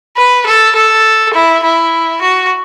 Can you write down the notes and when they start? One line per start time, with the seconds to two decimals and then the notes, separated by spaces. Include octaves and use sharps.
0.17 B4
0.47 A4
0.75 A4
1.34 E4
1.64 E4
2.22 F#4